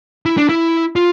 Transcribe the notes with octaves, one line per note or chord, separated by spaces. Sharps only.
E4
D4
E4
F4